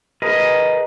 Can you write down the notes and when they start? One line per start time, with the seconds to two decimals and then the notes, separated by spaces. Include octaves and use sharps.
0.22 G#4 A#4 B4 D#5